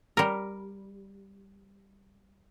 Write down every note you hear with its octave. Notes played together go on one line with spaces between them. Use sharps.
G3 A#4